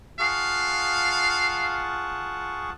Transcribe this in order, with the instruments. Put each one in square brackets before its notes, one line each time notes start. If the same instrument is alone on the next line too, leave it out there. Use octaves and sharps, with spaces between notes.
[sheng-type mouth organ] F4 F#5 A5 [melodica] G#4 C#6 [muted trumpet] F5